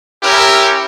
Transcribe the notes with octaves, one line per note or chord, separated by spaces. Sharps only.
C#4 E4 G4 A#4